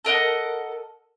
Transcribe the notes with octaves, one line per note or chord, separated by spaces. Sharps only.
A4 A#4 D#5 F#5